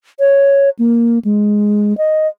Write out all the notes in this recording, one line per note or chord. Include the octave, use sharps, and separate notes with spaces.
C#5
A#3
G#3
D#5